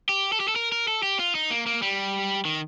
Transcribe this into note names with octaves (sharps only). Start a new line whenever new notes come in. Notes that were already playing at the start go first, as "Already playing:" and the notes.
G4
A4
G4
A4
A#4
A#4
A4
G4
F4
D#4
A#3
A#3
G3
D#3